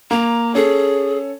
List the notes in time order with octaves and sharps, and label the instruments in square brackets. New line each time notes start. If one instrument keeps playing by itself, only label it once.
[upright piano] A#3 [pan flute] A#5
[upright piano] C#4 A4 [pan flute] G#4